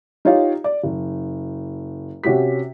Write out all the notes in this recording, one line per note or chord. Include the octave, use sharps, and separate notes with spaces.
D#4 F4 G4 C#5 F5
D5
F#1
C3 C#4 F#4 G4 B6